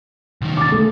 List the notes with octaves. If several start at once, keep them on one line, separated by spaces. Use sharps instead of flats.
C2 D#3
D6 A6
A3